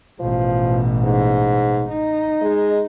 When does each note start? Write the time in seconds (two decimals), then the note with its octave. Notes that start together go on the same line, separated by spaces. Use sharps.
0.20 A1 B2 F3
1.04 G#2
1.89 D#4
2.41 G#3